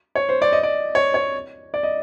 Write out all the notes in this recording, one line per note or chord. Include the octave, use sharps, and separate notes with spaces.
C#5
C5
D5
D#5
D5
C#5
C#5
D5
D#5